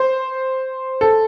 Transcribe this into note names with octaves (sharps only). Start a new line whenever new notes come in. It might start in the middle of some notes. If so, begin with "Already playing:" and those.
Already playing: C5
A4